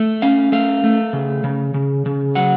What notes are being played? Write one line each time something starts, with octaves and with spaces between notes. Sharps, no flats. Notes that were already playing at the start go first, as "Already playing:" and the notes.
Already playing: A3
C#4 F5
A3 F5
A3
C#3
C#3
C#3
C#3
F#3 F#5